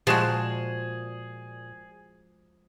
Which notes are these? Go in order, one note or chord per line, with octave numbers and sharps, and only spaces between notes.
A#2 F3 G#3 F#4 G#4 E7